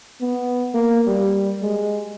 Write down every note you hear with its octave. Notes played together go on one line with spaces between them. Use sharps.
B3
A#3
G3
G#3